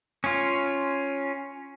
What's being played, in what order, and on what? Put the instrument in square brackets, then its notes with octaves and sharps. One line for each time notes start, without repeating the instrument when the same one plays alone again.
[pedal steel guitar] C#4 F4